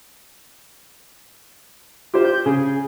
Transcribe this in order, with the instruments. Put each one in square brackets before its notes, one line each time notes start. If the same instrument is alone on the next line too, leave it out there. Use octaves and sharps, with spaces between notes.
[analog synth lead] F4 [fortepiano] G4 C5
[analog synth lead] G6
[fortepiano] C#3 [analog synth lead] G#4